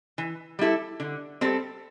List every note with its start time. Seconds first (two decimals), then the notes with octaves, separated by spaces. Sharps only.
0.18 E3
0.59 G3 E4 A4
1.00 D3
1.41 G3 C4 A4